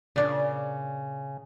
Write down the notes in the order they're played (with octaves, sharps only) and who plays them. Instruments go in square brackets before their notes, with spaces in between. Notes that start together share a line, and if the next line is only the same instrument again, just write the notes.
[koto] A#2 D4 [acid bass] C#3